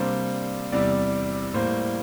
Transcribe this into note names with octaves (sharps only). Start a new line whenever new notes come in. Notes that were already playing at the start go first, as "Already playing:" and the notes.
Already playing: C3 G3 A#3 D4 C5
E2 C3 G3 D5
A2 G3 A#3 C5